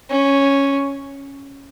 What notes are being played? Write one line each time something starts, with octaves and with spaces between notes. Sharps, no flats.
C#4